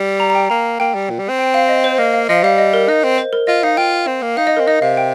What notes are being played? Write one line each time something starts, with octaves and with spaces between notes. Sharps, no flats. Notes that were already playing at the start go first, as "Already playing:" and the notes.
Already playing: G3
A#5
A#5
G5
A#3 A#5
A#3 G5
G3
A#2
G3
C4
G5
F5
D#5
C5
A#3 D#5
F5
F3 D#5
G3 F5
D#5
A#4
D#4 D#5
C4
C5
A#4
F4 D#5
D#4 F5
F4 G5
C4
A#3
D#4 F5
D#5
A#4
C4
D#4 D#5
C3 F5
G5